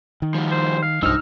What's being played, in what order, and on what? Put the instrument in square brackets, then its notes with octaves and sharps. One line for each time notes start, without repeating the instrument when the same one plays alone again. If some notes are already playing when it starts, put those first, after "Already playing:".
[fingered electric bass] D#3
[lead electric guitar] F3 G3
[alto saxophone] C5
F5
[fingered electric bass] B1 G2 [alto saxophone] F3 [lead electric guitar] D#4 [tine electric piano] E6 F6